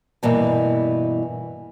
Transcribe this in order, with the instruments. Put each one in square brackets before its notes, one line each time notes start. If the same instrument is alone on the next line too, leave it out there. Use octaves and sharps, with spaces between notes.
[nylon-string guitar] G2 B2 E3 A#3